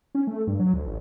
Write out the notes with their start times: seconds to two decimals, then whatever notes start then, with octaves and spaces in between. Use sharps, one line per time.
0.15 C#4
0.27 A3
0.47 G2
0.59 F#3
0.74 D2
0.86 A1